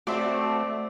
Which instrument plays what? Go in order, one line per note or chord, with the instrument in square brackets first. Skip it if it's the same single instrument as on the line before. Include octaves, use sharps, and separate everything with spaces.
[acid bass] A3 [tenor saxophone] C4 [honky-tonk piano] F#4 C5 E5 [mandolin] D5